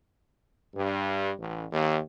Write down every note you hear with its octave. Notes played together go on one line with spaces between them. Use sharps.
G2
A1
D#2